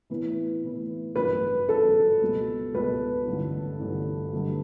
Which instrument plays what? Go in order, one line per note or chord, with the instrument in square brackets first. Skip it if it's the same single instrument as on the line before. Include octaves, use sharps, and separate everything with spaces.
[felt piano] A2 E3 B3 E4 B4
A2 E3 B3 E4 B4
[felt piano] A1 G2 F#3 C#4 [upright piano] B4
[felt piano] A1 G2 F#3 C#4 [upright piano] A4
[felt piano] C#2 B2 G3 B3
[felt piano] C#2 B2 G3 B3 [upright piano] B4
[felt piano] A1 G2 D3
A1 G2 D3
G2 D3 G3